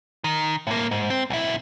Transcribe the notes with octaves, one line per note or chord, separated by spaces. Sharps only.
D#3
A2 A#3
G#2
C4
B1 E4